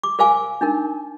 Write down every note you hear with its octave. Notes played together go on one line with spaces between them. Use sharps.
D6
A#4 C5 F5 G#5 D6
D4 D#4 A#4